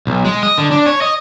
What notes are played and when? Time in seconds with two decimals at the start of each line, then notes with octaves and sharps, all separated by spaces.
0.07 B1
0.25 G#3
0.43 D#5
0.58 D3
0.72 D4
0.86 C#5
1.02 D#5